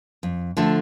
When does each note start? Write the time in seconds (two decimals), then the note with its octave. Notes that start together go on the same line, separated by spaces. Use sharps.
0.23 F2
0.57 D3 F3 A3